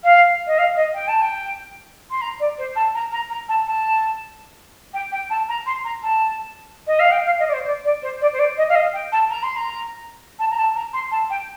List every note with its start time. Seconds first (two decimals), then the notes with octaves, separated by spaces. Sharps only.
0.03 F5
0.47 D#5
0.58 F5
0.76 D#5
0.94 G5
1.08 A5
1.22 G5
2.10 C6
2.21 A#5
2.40 D5
2.58 C5
2.75 A5
2.94 A#5
3.12 A#5
3.30 A#5
3.48 A5
3.67 A5
4.93 G5
5.12 G5
5.30 A5
5.48 A#5
5.66 C6
5.84 A#5
6.03 A5
6.87 D#5
6.99 F5
7.11 G5
7.25 F5
7.39 D#5
7.48 D5
7.53 C5
7.66 D5
7.85 D5
8.02 C5
8.21 D5
8.33 C5
8.39 D5
8.57 D#5
8.69 F5
8.75 D#5
8.93 G5
9.12 A5
9.30 A#5
9.43 C6
9.56 A#5
10.39 A5
10.51 A#5
10.57 A5
10.75 A#5
10.93 C6
11.11 A5
11.30 G5